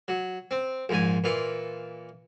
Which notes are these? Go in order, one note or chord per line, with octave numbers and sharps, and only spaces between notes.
F#3
C4
A#1 G#2 G#5
A#2 E3 F4